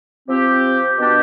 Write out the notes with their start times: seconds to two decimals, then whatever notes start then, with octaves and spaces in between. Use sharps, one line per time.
0.28 F3 C4 G4
0.97 B2 B3 D4 G4